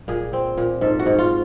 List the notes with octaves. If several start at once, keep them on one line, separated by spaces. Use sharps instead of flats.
A#2 G#4
C4
A#2
G#2 A4
F#4
G#2
F4